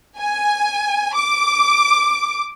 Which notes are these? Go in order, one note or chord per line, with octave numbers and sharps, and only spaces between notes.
G#5
D6